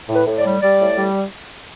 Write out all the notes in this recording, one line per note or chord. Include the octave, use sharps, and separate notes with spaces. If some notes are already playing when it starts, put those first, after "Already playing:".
A2
B4
A2
D5
G3
G3 D5
A2
G3